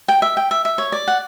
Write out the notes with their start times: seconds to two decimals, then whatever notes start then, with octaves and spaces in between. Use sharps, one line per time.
0.08 G5
0.22 E5
0.37 G5
0.51 E5
0.65 E5
0.78 C#5
0.92 D5
1.08 F#5